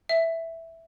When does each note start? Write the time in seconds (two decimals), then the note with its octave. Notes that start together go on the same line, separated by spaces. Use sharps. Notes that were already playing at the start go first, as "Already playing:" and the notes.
0.09 E5